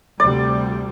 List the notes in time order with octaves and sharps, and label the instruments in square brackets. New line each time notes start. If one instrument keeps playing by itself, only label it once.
[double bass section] D2 C3 G3 [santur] D5